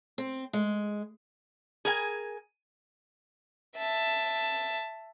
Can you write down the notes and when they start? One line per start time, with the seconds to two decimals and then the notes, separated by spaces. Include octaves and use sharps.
0.18 C4
0.53 G#3
1.85 G#4 A#4 G#5
3.77 E5 A5